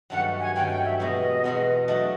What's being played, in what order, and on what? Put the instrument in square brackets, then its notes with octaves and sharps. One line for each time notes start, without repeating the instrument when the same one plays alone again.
[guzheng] G2 D#3 F#3 A3 C#4 [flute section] F#5
[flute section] G#5
[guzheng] G2 D#3 F#3 A3 C#4 [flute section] G5
[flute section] G5
E5
[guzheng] E2 B2 G#3 B3 [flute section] D#5
[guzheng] E2 B2 G#3 B3
[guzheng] F#3 A3 D4 [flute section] D#5